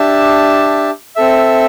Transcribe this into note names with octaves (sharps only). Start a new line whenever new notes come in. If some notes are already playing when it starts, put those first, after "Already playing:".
Already playing: D4 G4 E5 A5
C4 A4 E5